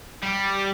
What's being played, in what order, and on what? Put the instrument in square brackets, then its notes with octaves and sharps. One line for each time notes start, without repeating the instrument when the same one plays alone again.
[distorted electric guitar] G3